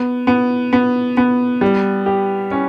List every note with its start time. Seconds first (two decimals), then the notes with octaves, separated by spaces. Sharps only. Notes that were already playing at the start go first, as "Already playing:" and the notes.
Already playing: B3
0.27 B3
0.73 B3
1.17 B3
1.61 G3
2.06 G4
2.51 C#4